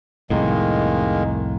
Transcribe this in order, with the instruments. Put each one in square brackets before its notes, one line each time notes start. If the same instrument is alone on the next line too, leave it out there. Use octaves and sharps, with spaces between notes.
[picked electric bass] C2 F2 A2 [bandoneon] D#3 G#3 A#3